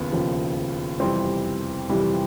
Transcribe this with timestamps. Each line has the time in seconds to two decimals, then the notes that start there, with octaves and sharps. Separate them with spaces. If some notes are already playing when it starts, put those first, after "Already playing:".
Already playing: E1 D#2 C#3 F3 B3
0.13 E1 D#2 C#3 F3
1.00 F2 C3 E3 G3 C4
1.89 F2 C3 E3 G3